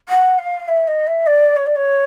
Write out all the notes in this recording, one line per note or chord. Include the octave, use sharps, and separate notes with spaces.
F#5
F5
E5
D#5
E5
D5
C#5
D5
C#5